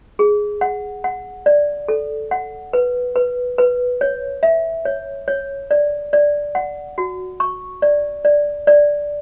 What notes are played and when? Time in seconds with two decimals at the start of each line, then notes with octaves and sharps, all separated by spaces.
0.19 G#4
0.61 F#5
1.04 F#5
1.46 D5
1.88 A4
2.31 F#5
2.73 B4
3.16 B4
3.58 B4
4.01 C#5
4.43 E5
4.85 C#5
5.28 C#5
5.71 D5
6.13 D5
6.55 F#5
6.98 F#4
7.40 C#6
7.82 D5
8.25 D5
8.67 D5